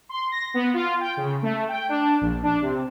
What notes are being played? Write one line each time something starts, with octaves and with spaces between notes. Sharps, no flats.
C6
A#6
B3
F4
G5
C#3
A3
G5
D4
A#1
D4
C3